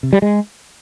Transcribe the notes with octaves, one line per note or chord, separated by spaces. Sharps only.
C3
G3
G#3